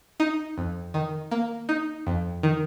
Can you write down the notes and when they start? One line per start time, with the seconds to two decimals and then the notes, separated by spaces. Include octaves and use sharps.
0.20 D#4
0.58 F2
0.94 D#3
1.31 A#3
1.69 D#4
2.07 F2
2.43 D#3